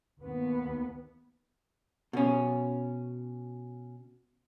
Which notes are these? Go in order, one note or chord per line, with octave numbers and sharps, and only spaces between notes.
D#2 B3
B2 C#4